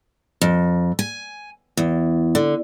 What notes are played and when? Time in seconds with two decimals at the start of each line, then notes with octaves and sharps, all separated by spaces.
0.42 F2
0.99 G#5
1.77 E2
2.35 D3